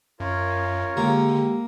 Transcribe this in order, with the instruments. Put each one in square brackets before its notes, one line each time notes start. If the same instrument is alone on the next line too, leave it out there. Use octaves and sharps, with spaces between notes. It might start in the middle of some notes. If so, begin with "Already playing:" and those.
[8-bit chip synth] F#2 [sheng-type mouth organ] F4 A#4 C#5
[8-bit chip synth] D3 [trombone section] G#3 G4 [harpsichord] A#3